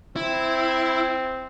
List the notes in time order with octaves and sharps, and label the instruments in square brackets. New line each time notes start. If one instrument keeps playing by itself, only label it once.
[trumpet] C4 [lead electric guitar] E4